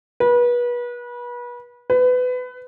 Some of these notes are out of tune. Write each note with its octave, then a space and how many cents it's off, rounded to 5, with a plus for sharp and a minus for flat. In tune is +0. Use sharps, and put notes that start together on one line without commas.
B4 -30
B4 +25